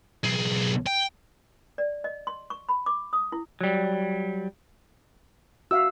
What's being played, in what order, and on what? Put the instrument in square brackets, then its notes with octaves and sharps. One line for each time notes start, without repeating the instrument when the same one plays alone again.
[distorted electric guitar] B1 G#4
G5
[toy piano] D5
D#5
C6
C#6
B5
D6
D#6
E4
[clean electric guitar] F#3 G3
[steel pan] F#4 E5 F5 [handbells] E6